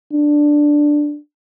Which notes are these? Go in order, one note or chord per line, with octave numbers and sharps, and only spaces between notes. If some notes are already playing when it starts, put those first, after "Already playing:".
D4